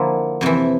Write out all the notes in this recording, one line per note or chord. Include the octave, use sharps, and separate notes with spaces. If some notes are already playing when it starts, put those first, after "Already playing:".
Already playing: D3 F3 A#3 E4
F2 C3 E3